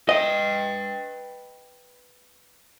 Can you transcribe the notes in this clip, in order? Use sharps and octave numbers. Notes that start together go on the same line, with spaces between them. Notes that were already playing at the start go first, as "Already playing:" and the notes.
B4 D#5 G5